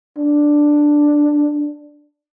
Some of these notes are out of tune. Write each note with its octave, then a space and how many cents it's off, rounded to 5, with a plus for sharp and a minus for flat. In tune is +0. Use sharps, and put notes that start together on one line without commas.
D4 +5